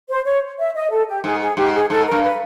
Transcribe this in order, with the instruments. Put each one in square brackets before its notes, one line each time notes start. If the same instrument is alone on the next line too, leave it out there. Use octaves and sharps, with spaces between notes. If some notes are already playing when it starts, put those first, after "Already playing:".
[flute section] C5
C#5
E5
D#5
A4
G4
[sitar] G#2 [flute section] G#4
[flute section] G#4
[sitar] G#2 [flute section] G4
[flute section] G#4
[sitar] G#2 [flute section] A4
[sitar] G2 [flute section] A#4
[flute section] B4